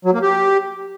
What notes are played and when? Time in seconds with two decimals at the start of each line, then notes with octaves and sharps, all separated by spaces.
0.05 F#3
0.14 A#3
0.22 G4